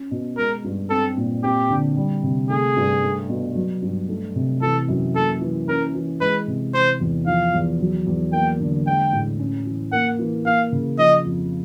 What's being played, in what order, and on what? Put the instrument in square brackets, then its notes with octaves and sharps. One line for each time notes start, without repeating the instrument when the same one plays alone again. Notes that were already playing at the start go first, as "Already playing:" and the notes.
Already playing: [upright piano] C#4
B2
[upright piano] G#3 [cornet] A#4
[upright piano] G2
[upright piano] C4 [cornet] A4
[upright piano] A#2
[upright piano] C4 [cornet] G4
[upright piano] D3
G3
C3
[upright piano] A3 [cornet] G#4
[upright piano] G2
A3
B2
F#3
G2
A3
C3
[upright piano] E3 [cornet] A4
[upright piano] F#2
[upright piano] A#3 [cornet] A4
[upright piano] E3
[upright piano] C#4 [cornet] A#4
[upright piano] E3
[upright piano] G#3 [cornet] B4
[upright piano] C3
[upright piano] E3 [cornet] C5
[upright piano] E2
[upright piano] F3 [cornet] F5
[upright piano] E2
F#3
E2
[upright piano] A#3 [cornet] G5
[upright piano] D3
[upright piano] G#3 [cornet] G5
[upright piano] A2
C#4
E3
[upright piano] A#3 [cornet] F#5
[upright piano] E3
[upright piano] A#3 [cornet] F5
[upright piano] C#3
[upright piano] F3 [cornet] D#5
[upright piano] F2